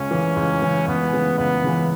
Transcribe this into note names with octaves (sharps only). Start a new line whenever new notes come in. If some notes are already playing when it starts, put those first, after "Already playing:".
Already playing: C#2 C#4
C#3 E3
C#2
C#3 E3
C#2 B3
C#3 E3
C#2 B3
C#3 E3